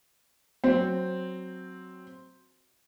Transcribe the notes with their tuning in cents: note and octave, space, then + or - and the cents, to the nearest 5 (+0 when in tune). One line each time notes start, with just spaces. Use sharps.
F#3 +0 C4 +0